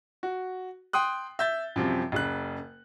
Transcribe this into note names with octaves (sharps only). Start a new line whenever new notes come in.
F#4
G5 C6 D#6 F#6
E5 G6 A6
F#2 C3 F3 G3
F#1 C#3 F#6